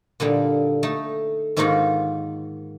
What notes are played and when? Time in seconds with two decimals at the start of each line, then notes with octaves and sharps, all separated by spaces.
0.20 A#2 D3 G3 D#4
0.83 A3 D#4 A5
1.57 G#2 D#3 A#3 D#4 F4 F#4